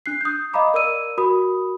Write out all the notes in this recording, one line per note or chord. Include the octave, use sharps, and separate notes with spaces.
D4 F#6 C7
D#6 G6
D#5 F5 A#5 B5 D6
A#4 D5 E6 D#7
F#4 A#4 B5 D#6